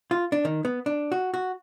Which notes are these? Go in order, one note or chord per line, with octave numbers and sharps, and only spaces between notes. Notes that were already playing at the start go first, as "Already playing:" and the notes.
F4
D4
D#3
B3
D4
F#4
F#4